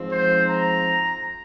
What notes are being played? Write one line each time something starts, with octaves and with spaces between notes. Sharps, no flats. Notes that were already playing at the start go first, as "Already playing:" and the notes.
Already playing: G#2 F3 C4
C5
A#5